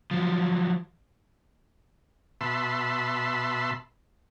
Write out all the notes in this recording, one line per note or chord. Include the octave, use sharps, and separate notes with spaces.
F3 F#3
B2 E5 A5 B5 C6